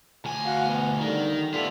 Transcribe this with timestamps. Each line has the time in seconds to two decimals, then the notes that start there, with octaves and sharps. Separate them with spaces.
0.25 D2 G#5
0.46 F#4 F5 F#5
0.66 B3
1.00 D3 D#3 G3
1.54 A3 B3 F4 A4 D5